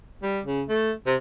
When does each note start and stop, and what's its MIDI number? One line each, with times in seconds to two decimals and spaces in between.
0.23 0.40 55
0.45 0.63 49
0.69 0.92 57
1.07 1.16 48